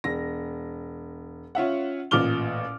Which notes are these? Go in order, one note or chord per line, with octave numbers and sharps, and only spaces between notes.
E1 A#6
C#4 F4 E5 F#5
A1 A#2 D6 F6 G7